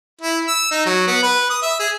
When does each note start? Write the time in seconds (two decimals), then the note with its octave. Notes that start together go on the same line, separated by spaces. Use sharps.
0.21 E4
0.48 E6
0.71 D#4
0.86 F#3
1.07 B3
1.23 B4
1.50 D#6
1.62 E5
1.79 G#4